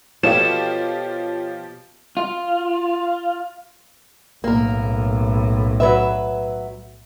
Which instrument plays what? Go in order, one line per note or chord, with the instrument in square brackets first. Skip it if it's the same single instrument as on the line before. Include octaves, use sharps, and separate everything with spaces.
[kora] B2 [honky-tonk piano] F3 F4 G4 [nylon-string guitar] A4 C#5 [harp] E7
[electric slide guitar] F4
[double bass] B1 A2 [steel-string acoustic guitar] A#3 A#4
[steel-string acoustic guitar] F#3 B4 E5